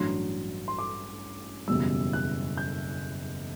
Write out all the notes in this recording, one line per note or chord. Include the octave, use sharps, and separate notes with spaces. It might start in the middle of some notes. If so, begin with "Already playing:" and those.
Already playing: A1 G2 F#3 C6
C6
D6
F#1 E2 B2 G3 E6
F#6
G6